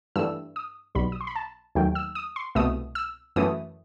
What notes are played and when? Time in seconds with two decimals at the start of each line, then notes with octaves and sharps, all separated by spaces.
0.16 G2 E3 A3 E6
0.56 D#6
0.95 B1 B2 G3 B5
1.12 D#6
1.21 C6
1.27 B5
1.36 A5
1.75 D#2 D#3 F#3 A3 G5
1.95 E6
2.15 D#6
2.36 C6
2.55 C2 B2 A3 D#6
2.95 E6
3.36 F#2 E3 A3 D#6